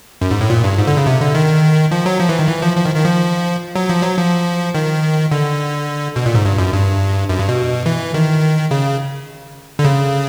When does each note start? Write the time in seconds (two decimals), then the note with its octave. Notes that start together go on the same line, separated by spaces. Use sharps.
0.21 F#2
0.31 G#2
0.41 A2
0.50 A#2
0.64 G2
0.78 G#2
0.88 D3
0.97 C#3
1.06 C3
1.21 D3
1.35 D#3
1.91 F3
2.06 F#3
2.20 F3
2.29 E3
2.39 D#3
2.48 E3
2.62 F3
2.77 F3
2.85 D#3
2.96 D#3
3.05 F3
3.76 F#3
3.89 F3
4.03 F#3
4.18 F3
4.75 D#3
5.32 D3
6.16 B2
6.26 A#2
6.35 G#2
6.45 G2
6.58 F#2
6.73 G2
7.29 F#2
7.39 G2
7.48 B2
7.86 E3
8.14 D#3
8.71 C#3
9.79 D3
9.84 C#3